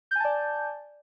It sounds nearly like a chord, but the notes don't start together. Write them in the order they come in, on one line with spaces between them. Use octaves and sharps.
G6 G#5 A5 D5